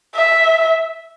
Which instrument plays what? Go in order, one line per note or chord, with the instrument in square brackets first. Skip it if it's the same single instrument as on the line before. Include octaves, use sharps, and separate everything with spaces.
[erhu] E5